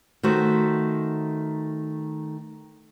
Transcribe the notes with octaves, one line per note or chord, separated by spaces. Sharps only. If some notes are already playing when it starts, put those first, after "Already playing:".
D#3 A3 F#4 C5